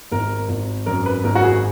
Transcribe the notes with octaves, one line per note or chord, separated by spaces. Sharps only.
G#1 A#4
G#1
F#2 A#4
B4
G#1 A#4
F#4
G#4